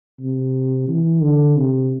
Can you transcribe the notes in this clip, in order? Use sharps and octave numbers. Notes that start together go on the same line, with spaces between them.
C3
E3
D3
C3